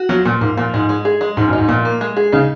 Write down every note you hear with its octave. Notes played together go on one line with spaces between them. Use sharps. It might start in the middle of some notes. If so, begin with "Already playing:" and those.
Already playing: F#4
F3 F#3
A#2 F3
G#2 A#3
A#2 F3
G#2 G#3
G#3
G#4
G#3
G#2 F3
F#2
D#4
G#2
A#2 F3
A#3
G#3
G#4
C#3 D#4